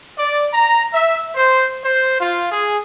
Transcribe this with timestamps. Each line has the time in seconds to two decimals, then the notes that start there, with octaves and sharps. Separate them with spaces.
0.17 D5
0.53 A#5
0.94 E5
1.35 C5
1.82 C5
2.20 F4
2.52 G#4